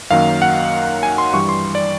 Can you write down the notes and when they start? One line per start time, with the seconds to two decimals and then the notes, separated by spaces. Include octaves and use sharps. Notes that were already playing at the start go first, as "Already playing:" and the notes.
0.11 F#2 D#3 F#3 A#3 F5
0.42 F#5
1.03 G#5
1.18 C6
1.33 G2 E3 G3 C#6
1.49 C6
1.75 D5